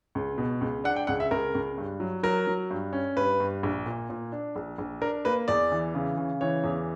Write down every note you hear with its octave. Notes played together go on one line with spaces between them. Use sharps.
C#2
B2
C#2
D4 F#5
G5
C#2 F#5
E5
C#2 A#4
C#2
G2
F#3
F#3 A#4
F#3
G2
C#4
G2 B4
G2
A#1
A#2
A#2
D4
A#1
A#1
D4 A#4
A#3 B4
E2 D5
E3
C#3
C#3
E3 C#5
E2